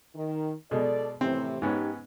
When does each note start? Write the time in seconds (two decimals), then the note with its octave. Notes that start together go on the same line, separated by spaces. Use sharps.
0.15 D#3
0.71 B2 G#3 A4 D5
1.21 A2 C3 E3 C4
1.62 G#2 B3 C#4 D#4 G4